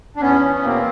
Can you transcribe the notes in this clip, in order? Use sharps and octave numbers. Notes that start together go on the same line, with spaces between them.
D4
E2 B3 C#4
E2
B2 A#3 C4